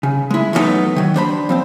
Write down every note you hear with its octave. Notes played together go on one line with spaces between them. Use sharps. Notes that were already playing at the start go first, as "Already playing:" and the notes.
C#3
G#3 E4
E3 F#3 G3 A3 B3 D#4
D#3 F#3
D4 C5 B5
F3 C4 C5